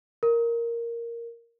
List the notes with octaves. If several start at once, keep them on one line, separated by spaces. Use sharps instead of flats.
A#4